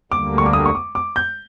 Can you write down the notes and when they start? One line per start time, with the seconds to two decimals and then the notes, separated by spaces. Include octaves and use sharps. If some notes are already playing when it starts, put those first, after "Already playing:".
0.11 D2 D3 G3 A#3 D6
0.38 C#6
0.46 D6
0.53 D#6
0.66 C#6
0.75 D6
0.95 D6
1.16 G6